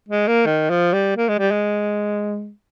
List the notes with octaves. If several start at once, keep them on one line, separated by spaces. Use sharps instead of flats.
G#3
A#3
D#3
F3
G3
A#3
G#3
G3
G#3